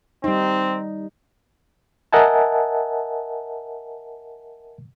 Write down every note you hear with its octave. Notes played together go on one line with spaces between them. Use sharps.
G3 C4 D#4
A#4 D#5 E5 F#5 G#5 A5